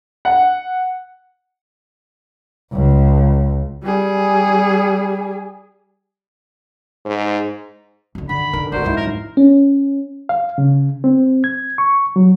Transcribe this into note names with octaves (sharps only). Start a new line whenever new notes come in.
F#5
C#2
G3 G#4
G#2
F#2 D3
D3 D#3 F#5 B5
D#3 A#4
G#1 F#4 A#4 C5 D5
F2 G#2 F3 D#4 E4
F#3 A#4
C#4
F5
C#3
C4
G#6
C#6
F#3